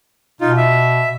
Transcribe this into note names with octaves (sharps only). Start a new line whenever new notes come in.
B2 D#4 F4
E5